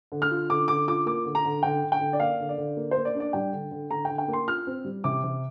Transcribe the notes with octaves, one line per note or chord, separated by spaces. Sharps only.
D3
F6
F4
D3 D6
D3 D6
F4 D6
A#3 D6
D3
A#5
D3
D3 G5
D3
G5
D3
D5
A#3 F5
D3
D5
D3
A#3
A#3 C5
D5
D4
D5
G3 G5
D3
D3
D3 A#5
G5
D3
G5
A#3
C6
F4 F6
C4
G3
C3 D6
C3